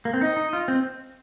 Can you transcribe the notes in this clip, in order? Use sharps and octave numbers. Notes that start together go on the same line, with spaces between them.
A#3
C4
D#4 D#5
D#4
F4
C4